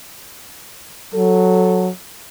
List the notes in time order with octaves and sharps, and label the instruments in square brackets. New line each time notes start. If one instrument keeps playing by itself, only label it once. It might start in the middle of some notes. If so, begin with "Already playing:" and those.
[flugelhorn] F#3 [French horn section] A4